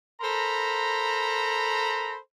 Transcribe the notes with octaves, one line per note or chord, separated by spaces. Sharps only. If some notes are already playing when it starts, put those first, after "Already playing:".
A4 A#4 C5 A#5 B5